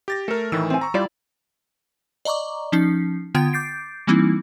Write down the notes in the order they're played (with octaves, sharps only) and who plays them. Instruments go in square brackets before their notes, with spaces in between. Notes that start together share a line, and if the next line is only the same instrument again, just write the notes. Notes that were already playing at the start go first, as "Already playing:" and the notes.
[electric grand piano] G4 A6 A#6
[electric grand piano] A3 A#4 [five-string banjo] A4
[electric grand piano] A2 D#3 E6 [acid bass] E3
[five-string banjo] C4 G#5
[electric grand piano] A#5 C#6
[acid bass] G3 [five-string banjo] E4 D5 [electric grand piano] F4
[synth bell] D5 D#5 A#5 C#6 D6
F3 C#4 D#4 C7
D3 B3 F4 G5 G#6 D7
D6 G6 A6 C7 D7
E3 G3 A#3 C4 D#4 E4